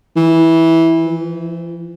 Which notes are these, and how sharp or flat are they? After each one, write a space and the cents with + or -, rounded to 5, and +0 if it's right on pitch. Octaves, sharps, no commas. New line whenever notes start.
E3 -10
F3 -45